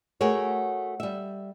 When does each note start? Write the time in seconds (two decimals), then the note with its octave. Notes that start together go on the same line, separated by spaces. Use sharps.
0.21 A3 F#4 G#4 A#4 C#5
1.00 G3 E5